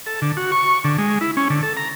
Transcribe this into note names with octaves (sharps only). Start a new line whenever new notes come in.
A4
D3
F#4
C#6
D3
G#3
E4
C#4
D3
A4
A#5